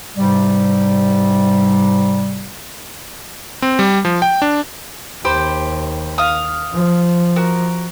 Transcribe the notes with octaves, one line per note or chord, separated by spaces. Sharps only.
G#2 C3 G3
C4
G3
F3
G5
D4
D#2 G4 C5 B5
F5 D#6
F3
F#4 A#4